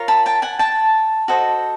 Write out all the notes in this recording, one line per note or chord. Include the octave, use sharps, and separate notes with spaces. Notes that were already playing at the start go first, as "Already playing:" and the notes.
Already playing: F4 A#4 C#5
A5 B5
G5 A5
F#5 G#5
G5 A5
F#4 A4 C5 D#5